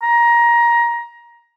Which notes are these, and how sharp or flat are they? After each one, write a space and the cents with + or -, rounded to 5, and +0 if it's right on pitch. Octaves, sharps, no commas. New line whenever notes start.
A#5 +20